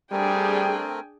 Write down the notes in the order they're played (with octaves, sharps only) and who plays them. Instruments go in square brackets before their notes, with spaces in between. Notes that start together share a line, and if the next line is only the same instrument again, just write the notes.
[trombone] G3 [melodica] A3 C4 A#4 [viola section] D4 G#4 [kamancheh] G5 G#5